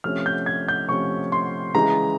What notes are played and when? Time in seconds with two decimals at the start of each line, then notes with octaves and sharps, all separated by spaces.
0.04 C3 F3 A3 C#4 F6
0.26 G6
0.46 G#6
0.68 G6
0.89 C3 F3 A3 C#4 C#6
1.32 C6
1.75 C#3 E3 G#3 A#5